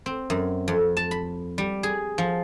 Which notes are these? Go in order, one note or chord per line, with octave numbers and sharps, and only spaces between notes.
C4
F#2
F2
A5
B5
G3
G#4
F3